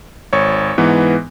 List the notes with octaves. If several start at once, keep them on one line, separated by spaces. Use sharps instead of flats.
G#1 C#5 C#6
G#2 E3 B3